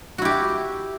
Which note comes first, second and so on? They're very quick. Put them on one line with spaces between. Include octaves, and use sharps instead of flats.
F#4 E4 G4